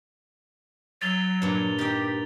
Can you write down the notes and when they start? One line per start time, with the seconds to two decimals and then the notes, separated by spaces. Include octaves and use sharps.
1.02 F#3 A6 F7 G7
1.42 G2 A#2
1.79 D#4 G4 G5